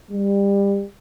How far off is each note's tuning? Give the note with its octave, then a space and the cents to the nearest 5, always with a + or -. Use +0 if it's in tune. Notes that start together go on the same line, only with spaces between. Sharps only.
G3 +25